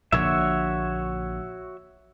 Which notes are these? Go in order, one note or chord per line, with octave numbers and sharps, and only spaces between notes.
A#1 A#2 D3 F#4 C#5 E5